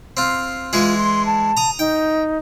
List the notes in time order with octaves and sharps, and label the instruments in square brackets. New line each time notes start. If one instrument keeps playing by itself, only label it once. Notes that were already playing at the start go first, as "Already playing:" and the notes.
[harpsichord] C4 F4
[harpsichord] E3 G#3 G#4 [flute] F4
[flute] C6
A5
[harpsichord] A#5 D#6
[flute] D#4 [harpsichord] G5